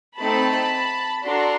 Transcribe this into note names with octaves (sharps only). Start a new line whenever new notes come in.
A3 C4 D#4 A5 B5
D4 F#4 A4 A#5 C6